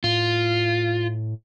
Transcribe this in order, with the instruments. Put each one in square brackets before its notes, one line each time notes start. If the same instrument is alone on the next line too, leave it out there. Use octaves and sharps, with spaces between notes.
[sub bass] A2 [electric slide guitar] F4